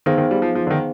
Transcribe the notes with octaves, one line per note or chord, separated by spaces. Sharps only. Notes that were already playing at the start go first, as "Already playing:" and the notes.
D#3 B3 D#4 G#4 C5 F5
D#3
G3
F3
F3
D3
D#3